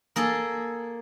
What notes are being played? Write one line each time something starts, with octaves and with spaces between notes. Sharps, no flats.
A#3 G#4 A4